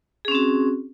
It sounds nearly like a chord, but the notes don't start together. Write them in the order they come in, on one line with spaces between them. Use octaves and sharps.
G#4 C#4 C4 F#4